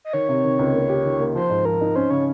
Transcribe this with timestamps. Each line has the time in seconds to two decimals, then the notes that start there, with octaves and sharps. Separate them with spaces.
0.05 D#5
0.13 D#3 C#5
0.29 C3
0.44 D#3
0.59 C#2
0.73 A#3
0.89 G4
1.05 D#3
1.20 A#3
1.35 F3 C5
1.50 G#2
1.65 F3 A#4
1.81 D#4
1.96 C#4 C5
2.10 C#3 C#5